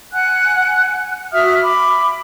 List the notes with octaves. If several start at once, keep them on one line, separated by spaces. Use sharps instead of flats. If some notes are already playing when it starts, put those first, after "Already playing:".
F#5 G#5 F#6
F#4 E5 D#6 F6
B5 D6